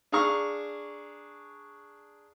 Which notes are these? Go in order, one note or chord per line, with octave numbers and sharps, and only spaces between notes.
D4 G#4 F5 A#5 C#6